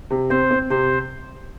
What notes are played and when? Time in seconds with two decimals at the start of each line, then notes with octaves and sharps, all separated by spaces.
0.10 C3
0.30 C4 C5
0.51 C4
0.70 C3 C5